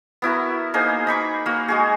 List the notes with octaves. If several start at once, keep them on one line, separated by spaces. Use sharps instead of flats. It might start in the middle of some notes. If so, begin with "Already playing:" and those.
B3 E4 F#4 A#4
A#3 D#4 G#4 C5
D#4 B5 C#6 D6
A#3 F#4
G#3 F#4 G#4